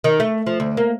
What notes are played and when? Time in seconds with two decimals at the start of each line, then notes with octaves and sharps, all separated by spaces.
0.04 D#3
0.20 A3
0.46 F3
0.60 D2
0.77 A#3